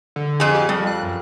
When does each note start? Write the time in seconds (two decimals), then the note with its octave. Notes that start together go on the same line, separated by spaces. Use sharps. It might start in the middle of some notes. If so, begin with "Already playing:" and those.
0.16 D3
0.40 F2 G#4
0.54 G4
0.69 F2 G3
0.87 F#6
1.02 F#2